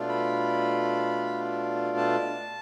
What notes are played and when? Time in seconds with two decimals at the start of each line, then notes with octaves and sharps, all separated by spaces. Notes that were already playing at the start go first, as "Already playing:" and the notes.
Already playing: B2 A3 D4 F4
0.09 B5
1.97 A5